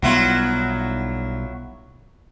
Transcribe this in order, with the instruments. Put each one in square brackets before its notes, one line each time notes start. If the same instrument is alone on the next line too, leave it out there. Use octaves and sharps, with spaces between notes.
[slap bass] B1 G3 B3 [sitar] F#3 E4 F4